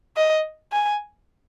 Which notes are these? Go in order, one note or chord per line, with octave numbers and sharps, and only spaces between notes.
D#5
G#5